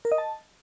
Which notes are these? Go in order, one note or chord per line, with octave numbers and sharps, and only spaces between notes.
A#4
D#5
A5